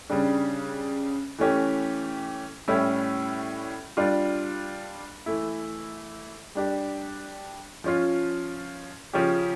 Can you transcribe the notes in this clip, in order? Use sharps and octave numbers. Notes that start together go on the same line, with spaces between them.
C#3 G3 D4
E3 A3 C#4 G4
A2 G3 C#4 E4
G3 D4 F4
E3 A3 E4
G3 D4 G4
F3 C#4 F4
C#3 F3 C#4 G4